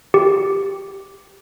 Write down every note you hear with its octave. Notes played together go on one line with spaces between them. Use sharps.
G4